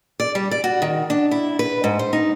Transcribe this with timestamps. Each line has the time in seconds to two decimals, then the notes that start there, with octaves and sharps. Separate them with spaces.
0.20 D5
0.35 G3
0.51 D5
0.64 F#4
0.82 D#3
1.10 D4
1.31 E4
1.59 B4
1.84 G#2
1.99 C5
2.13 D#4